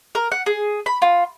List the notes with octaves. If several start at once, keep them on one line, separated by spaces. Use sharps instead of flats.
A#4
F#5
G#4
B5
F4